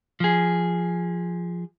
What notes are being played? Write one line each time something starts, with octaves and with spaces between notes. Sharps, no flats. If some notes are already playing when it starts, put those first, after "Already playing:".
F3 G#4